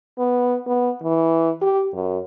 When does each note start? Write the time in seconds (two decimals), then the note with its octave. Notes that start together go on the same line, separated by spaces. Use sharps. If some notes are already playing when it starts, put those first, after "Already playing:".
0.18 B3
0.67 B3
1.03 E3
1.61 G4
1.94 F#2